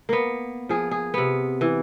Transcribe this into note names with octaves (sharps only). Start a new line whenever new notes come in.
A#3 B3
F3 G#4
G#4
C3 B3
E3